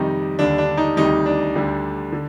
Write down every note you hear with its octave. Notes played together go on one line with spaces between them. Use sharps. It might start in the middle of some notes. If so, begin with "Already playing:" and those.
Already playing: F2 C3 D#3 G3 D#4
D#2 D3 G3 D4
D4
D#4
D2 C3 D#3 G3 D#4
D4
D2 D3 G3
D3